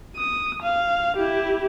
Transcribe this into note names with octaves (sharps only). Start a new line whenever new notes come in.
D#6
F5
E4 G4